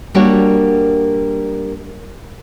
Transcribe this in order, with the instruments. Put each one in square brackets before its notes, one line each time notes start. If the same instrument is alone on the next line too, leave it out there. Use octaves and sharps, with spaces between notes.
[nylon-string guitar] G3 A#3 D4 F#4 A#4 C#5